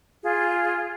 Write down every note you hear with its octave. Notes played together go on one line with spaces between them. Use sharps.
F4 G#4